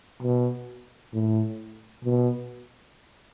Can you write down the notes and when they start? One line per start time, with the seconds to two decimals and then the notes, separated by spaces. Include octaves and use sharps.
0.23 B2
1.14 A2
2.04 B2